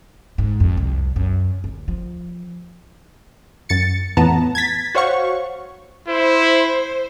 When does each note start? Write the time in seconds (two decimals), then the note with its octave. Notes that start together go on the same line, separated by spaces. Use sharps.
0.38 G#2
0.60 F2
0.77 C2
1.16 F#2
1.64 D2
1.88 F3
3.69 F#2 A6 C#7
4.17 F2 A2 E3 B3 A5 A#5
4.55 G#6 A6 B6
4.95 F#4 C5 C#5 F5 F#5 C#6
6.08 E4 C5